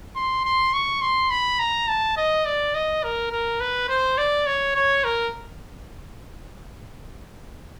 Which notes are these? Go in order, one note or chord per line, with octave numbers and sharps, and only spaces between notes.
C6
C6
C#6
C6
B5
A#5
A5
D#5
D5
D#5
A#4
A#4
B4
C5
D5
C#5
C#5
A#4